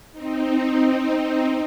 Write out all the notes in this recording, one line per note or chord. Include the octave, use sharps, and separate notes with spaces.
C4 D#4